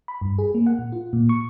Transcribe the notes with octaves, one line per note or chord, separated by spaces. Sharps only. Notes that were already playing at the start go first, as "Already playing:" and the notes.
B5
G2
G#4
A#3
F#5
A#2
F4
A#2
C#6